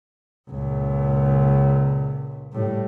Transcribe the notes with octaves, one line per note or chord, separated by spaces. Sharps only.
C#2 A#2
A2 G3